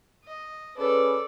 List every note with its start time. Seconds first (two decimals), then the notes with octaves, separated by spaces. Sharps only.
0.25 D#5
0.76 C#4 G#4 A4 B4 D5